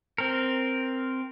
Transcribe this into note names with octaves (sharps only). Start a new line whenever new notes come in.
C4 A#4